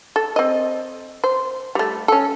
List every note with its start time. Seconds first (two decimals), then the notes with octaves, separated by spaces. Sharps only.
0.16 A4
0.36 C4 D#5
1.24 C5
1.75 G3 A3
2.08 C#4 A4